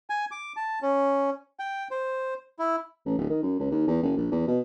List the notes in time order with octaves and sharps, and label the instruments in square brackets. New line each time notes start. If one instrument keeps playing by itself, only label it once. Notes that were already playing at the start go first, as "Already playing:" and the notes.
[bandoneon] G#5
D6
A5
C#4
G5
C5
E4
[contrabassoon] A1
D1
D#3
F#2
C#2
D#2
E2
F#1
A#1
E2
B2